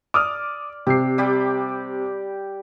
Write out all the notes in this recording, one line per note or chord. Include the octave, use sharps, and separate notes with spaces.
D5 D6 D#6 F6
C3 G4 C7
G3 G4 D5